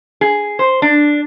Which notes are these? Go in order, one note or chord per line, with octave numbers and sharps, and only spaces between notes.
G#4
C5
D4